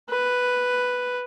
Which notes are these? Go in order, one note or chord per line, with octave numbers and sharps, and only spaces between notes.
B4